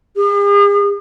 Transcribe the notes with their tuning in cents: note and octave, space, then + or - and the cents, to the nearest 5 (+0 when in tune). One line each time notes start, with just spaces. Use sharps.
G#4 -45